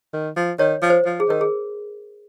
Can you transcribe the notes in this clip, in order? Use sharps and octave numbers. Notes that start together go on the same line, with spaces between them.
D#3
F3
D#3 C#5
F3
C5
F3
G#4
D#3 A#4
G#4